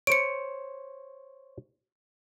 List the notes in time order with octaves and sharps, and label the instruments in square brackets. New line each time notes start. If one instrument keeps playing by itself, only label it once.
[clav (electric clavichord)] C5 C#5 [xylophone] C#7 D7